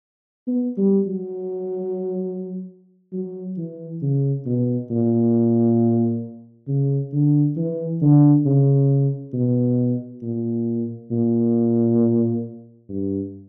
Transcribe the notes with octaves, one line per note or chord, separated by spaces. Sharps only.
B3
G3
F#3
F#3
E3
C#3
B2
A#2
C#3
D3
E3
D3
C#3
B2
A#2
A#2
G2